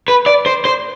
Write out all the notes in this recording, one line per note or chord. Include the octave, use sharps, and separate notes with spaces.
B4
D5
C5
C5